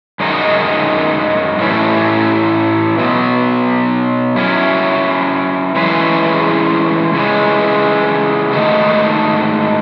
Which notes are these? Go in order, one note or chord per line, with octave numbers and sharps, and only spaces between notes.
F#2 D#3 G#3 D#4 F#4
A2 E3 A3 C#4
B2 F#3 B3
F#3 C#4 E4
E3 G#3 C#4 G#4 B4
C#3 E3 G#3
G#2 D#3 A3 D#4 F#4